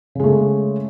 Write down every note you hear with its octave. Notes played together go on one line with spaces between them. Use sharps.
C#3 G#3 A3